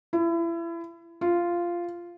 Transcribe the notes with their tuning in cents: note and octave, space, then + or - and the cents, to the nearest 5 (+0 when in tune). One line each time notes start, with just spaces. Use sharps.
E4 +30
F4 -10